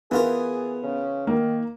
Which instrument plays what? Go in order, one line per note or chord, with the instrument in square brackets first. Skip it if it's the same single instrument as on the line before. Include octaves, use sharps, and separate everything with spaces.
[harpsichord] E3 F4 A#4 [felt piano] B3 [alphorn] G#4
[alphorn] C#3
[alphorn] D#3 [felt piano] A#3